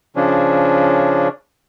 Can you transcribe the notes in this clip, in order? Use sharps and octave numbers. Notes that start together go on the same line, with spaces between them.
C#3 F3 C#4 D4